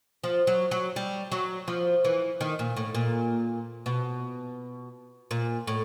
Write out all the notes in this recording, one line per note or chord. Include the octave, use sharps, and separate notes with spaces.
F3
F#3
F#3
G3
F#3
F3
E3
D#3
A#2
A2
A#2
B2
A#2
A2